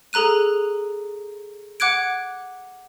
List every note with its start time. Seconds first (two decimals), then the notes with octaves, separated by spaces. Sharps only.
0.13 G#4 A4 A#5 F#6 D#7
1.80 F#5 D6 F#6 G#6 D7